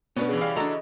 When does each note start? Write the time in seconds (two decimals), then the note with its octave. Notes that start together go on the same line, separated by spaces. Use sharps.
0.16 B2 B3 C#4 D4 B4
0.28 C#3 E3 G#4
0.41 G3 F5
0.56 D4 F#4 A4 D#5 A#5